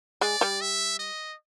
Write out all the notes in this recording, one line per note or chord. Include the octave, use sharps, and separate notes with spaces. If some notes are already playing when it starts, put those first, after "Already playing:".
G#3 G#4 D5
G3 G4
E5
D#5